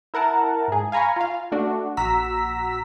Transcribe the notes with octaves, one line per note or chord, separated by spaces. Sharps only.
E4 A#4 F#5 A5
G#2 G#4
F5 G#5 A#5 B5 C#6
F4 F5
A3 D4 F#4
A#1 F#4 A#5 E6 B6